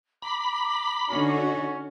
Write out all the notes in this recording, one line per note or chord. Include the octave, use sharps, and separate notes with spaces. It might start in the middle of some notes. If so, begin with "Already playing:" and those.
A#5 B5 D6
D3 C#4 D#4 F#4